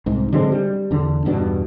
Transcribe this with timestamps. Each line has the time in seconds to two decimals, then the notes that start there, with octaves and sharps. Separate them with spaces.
0.06 C2 G#2
0.33 D3 F#3 G#3 C4
0.52 G3
0.91 E2 D3
1.25 E2 G2 B2 D4